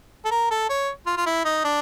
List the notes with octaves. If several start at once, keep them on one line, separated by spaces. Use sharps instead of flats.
A4
A#4
A4
C#5
F4
F4
E4
D#4
D4